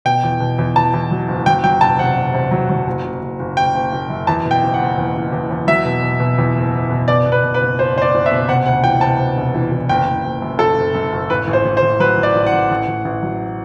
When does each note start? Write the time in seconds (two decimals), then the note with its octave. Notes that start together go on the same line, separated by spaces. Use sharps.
0.05 B2 G5
0.23 E2
0.40 B2
0.59 E2
0.76 E2 A5
0.94 E2
1.11 F#3
1.28 F#1
1.46 F#3 G5
1.64 F#3 G5
1.81 E1 A5
1.98 C3 F#5
2.17 E1
2.34 C3
2.51 F#3
2.69 F#3
2.86 F#1
3.04 F#1
3.22 F#1
3.39 F#1
3.57 F#1 G5
3.74 F#1
3.92 F#1
4.10 F#2
4.27 E2 A5
4.45 B2
4.51 G5
4.63 F#1
4.74 F#5
4.80 F#1
4.97 E2
5.15 F#1
5.32 E2
5.51 E2
5.67 F#3 E5
5.85 B2
6.03 B2
6.20 B2
6.38 E2
6.55 F#1
6.73 F#1
6.90 B2
7.08 B2 D5
7.26 B2
7.32 B4
7.43 B2
7.54 B4
7.61 F#1
7.78 F#1 C5
7.96 F#1 C5
8.02 D5
8.14 F#1
8.26 E5
8.31 B2
8.48 C3 F#5
8.66 D2 F#5
8.83 E3 G5
9.01 C3 A5
9.19 C3
9.37 E1
9.54 E3
9.72 E3
9.89 F#1 G5
10.07 F#1
10.24 F#1
10.42 F#2
10.59 F#1 A4
10.78 F#1
10.94 F#2
11.12 F#1
11.30 A1 B4
11.47 A1
11.53 C5
11.65 A1
11.77 C5
11.82 A1
12.00 F#3 B4
12.17 A1
12.23 D5
12.35 A1
12.47 F#5
12.53 A1
12.71 A1
12.88 A1
13.05 A1
13.23 F#3